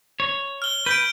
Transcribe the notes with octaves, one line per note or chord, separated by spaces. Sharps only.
C#5
F6 G7
B4 G6 D7